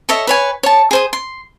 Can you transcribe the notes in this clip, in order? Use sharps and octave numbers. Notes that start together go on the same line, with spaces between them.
A4 C#5 D#5 E5
B4 C#5 G#5
C#5 A5
G#4 C5 D#6
C6